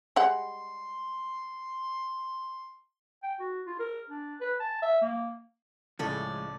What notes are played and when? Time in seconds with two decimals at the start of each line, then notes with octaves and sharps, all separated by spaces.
0.16 G3 G#3 F#5 C6
3.23 G5
3.39 F#4
3.66 F4
3.79 A#4
4.09 D4
4.41 B4
4.60 A5
4.82 E5
5.01 A#3
5.99 C#2 A2 C#3 F3 G#3 A4 C#5 D5